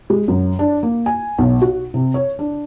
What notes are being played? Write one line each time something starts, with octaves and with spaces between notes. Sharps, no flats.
G#3
F#2
D4
A#3
G#5
B1
F#4
C3
C#5
D4